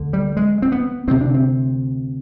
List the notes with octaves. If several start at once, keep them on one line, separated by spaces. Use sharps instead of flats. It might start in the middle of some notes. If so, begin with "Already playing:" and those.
Already playing: D2 D3
G3
G#3
C4
B3
D2 C3 C4
D4
C4